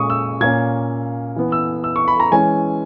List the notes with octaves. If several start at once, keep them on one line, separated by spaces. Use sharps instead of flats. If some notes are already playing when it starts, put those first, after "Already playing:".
Already playing: A#2 G#3 C#4 C#6 D#6
E6
A#2 A#3 C#4 G#6
E3 B3
E6
E6
C#6
B5
A#5
E3 G#3 C#4 G#5